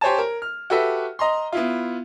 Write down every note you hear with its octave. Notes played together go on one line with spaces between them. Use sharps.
G4 C5 C#5 G#5 A5
A#4
F6
F#4 G4 A4 B4 E5
D#5 A#5 C6
B3 E4 F4